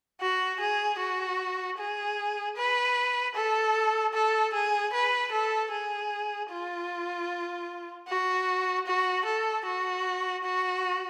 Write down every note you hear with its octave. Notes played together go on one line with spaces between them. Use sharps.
F#4
G#4
F#4
G#4
B4
A4
A4
G#4
B4
A4
G#4
F4
F#4
F#4
A4
F#4
F#4